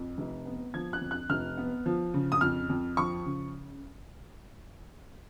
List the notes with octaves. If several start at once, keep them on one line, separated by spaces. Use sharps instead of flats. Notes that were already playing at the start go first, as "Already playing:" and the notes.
Already playing: F2
F1
B3
F3 G#6
F#6
F2
F#6
F1 F6
B3
F3
C#3
D#6
F2 F6
F2
F3 C#6
C#3